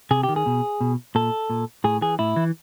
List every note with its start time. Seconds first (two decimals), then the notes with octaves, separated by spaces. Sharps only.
0.11 C3 G#4
0.23 G4
0.29 D#3
0.36 G#4
0.46 B2
0.81 B2
1.15 A#2 A4
1.50 A#2
1.84 A2 G#4
2.01 E3 G#4
2.19 A2 E4
2.36 E3